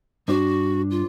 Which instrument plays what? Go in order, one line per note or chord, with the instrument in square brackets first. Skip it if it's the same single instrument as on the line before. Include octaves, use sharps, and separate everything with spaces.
[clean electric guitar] G2 D4 C5 [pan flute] F#4
[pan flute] F4